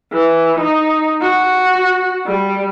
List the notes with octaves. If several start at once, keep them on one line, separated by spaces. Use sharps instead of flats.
E3
D#4
F#4
G3